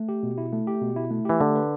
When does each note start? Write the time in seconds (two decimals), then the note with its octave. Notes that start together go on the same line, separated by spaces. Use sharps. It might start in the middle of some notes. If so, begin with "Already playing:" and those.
Already playing: A3
0.09 G4
0.23 B2
0.38 E4
0.53 A3
0.67 G4
0.82 B2
0.96 E4
1.11 A3
1.25 E3 G4
1.41 D3 A3
1.55 B4